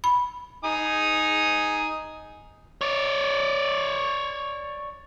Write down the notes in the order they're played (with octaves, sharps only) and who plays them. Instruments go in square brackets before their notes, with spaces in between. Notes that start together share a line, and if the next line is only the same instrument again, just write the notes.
[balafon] B5
[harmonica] D#4 G#5 D#6
[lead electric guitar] C#5 D5